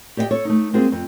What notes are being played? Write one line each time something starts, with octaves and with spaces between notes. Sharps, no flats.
G4 D5 D#5 F5 G5
A4 C#5
A3 D#4
G#3 A#3 C4 F4 F#4 G#4
F2